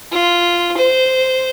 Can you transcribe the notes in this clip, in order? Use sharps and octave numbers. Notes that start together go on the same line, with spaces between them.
F4
C5